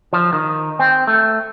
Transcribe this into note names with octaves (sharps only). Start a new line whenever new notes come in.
F3
D#3
C4
A3